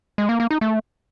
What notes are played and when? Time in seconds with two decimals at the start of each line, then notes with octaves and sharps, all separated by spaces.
0.18 G#3
0.29 A#3
0.40 A#3
0.51 D#4
0.61 A3